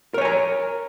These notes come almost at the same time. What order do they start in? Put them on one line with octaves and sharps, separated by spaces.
A#4 C#5 G#5 A#5